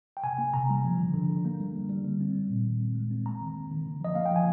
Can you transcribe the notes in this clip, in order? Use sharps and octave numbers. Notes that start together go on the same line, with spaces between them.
G5
C3 G#5
A#3
C3 A#5
G3
F3
D3
D3
D3
A#3
G3
G3
G3
G3
C4
G3
A#2
D#3
C4
G#3
C4
A#3 A#5
D#3
A#3
D#3
D3
F3 D#5
A#3 F5
G5
F3 G#5